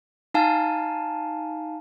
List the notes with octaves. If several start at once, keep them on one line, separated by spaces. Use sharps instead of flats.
D#4 F5 G#5 A5